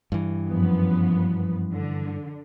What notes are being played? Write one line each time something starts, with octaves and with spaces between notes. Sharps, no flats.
G2 E3
F#2 F3 B3
D3